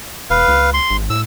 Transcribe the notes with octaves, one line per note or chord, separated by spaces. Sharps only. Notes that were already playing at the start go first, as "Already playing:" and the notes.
E1 B4 F5
C#2
C6
G#1
A2 E6